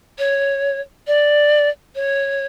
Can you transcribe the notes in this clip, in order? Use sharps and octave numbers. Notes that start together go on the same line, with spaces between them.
C#5
D5
C#5